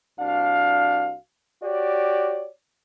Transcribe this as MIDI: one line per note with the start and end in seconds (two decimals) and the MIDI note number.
0.19 1.15 36
0.19 1.15 62
0.19 1.15 66
0.19 1.15 77
1.64 2.47 66
1.64 2.47 67
1.64 2.47 73
1.64 2.47 74